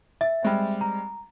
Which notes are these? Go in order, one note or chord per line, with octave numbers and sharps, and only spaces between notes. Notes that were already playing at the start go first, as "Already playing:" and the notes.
E5 A6
G3 G#3 C4
A#5